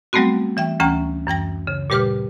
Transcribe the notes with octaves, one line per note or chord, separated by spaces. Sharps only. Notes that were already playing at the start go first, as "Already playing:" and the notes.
F#3 G3 A3 B3 C4 F#4
E3 E5 G5
D2 E3 C#4 G5 A#5
F#2 E3 G5 A#6
C#3
A#2 G3 G4 B4 D6 F6